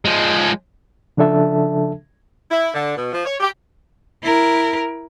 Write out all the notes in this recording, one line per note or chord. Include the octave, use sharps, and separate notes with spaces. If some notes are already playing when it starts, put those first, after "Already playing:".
F3 G#3
C#3 F3 D4 A4 E5 A5
E4
D3
B2
F3
C#5
G4
E4 A#4